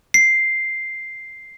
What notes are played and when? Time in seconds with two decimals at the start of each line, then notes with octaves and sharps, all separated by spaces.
0.14 C7